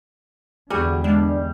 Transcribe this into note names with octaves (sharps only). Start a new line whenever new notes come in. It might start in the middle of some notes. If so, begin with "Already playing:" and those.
E2 G#2 D3 G3 F#4 G#4 G#5
G#3 D4